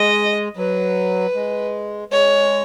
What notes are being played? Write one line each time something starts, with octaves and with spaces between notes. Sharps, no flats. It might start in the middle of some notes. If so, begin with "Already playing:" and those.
Already playing: G#3 D#5
F#3 B4
G#3
G#3 C#5